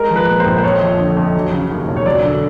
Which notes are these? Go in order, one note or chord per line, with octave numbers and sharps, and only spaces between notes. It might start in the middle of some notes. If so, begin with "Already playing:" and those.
Already playing: G#3 A#4
F3
B4
A#2
C5
A#1
C5
F2 C#5
F3
D3
F2
F#3
C#3
D#2
E1
C#5
F#3 D5
D3